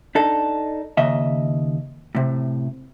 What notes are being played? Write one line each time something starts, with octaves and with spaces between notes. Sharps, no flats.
D4 D#4 A4
D#2 C#3 D#5 E5
A2 C3